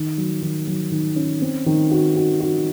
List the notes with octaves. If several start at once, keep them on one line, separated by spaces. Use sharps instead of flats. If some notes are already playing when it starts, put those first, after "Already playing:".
Already playing: D#3
F#3
D#3
F#3
D#3
C#4
C4
D#3
F#4
F#4
F#4